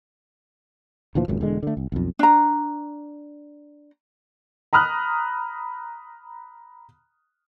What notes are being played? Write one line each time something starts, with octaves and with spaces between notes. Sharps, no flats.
D2 A#2 E3 F3
G#1 C#2 F#2
E1 D3 G#3
D3 A3
C2
B1 F2
D4 A#5
A#5 B5 D#6 F6 F#6